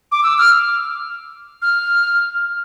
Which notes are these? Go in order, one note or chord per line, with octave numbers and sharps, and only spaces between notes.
D6
E6
F6
F6